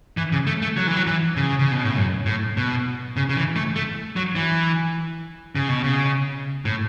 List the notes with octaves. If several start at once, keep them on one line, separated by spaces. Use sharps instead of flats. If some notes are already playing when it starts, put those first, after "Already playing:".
E3
C#3
A3
A3
F#3
E3
F#3
E3
C#3
C#3
B2
A2
F#2
A2
B2
C#3
C#3
E3
A3
A3
F#3
E3
C#3
B2
C#3
A2